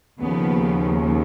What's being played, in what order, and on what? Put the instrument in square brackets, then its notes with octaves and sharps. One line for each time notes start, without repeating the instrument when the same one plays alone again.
[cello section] D#2 C#3 F3 B3